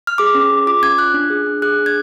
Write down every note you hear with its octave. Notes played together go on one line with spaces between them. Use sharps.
F6
G#4 D6
C#4
G#4
F4 D6
C#4 G#6
F4 F#6
D4
G#4
D4
G#4 F#6
D4
G#6